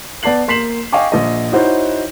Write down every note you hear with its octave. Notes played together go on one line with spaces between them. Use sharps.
B3 D5 A5 C7 F#7
A#3 C6 B6 C7 E7 F#7
D#5 F5 G5 G#5 C#6 D6
A#1 D#5
D#4 E4 F#4 C5 C#5